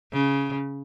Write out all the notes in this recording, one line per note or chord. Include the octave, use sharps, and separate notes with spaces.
C#3